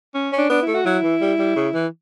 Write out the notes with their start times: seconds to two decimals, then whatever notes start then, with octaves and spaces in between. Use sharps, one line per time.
0.14 C#4
0.32 C#4
0.38 D4
0.50 B3 D4
0.62 E4
0.67 A3
0.74 F#4
0.86 F#3 E4
1.03 E3
1.21 G3
1.39 G3
1.56 C#3
1.74 E3